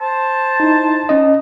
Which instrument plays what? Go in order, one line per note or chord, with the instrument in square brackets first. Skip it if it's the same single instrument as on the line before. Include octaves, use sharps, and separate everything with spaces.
[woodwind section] C5 A5
[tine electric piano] D#4 E4
C#4 D#5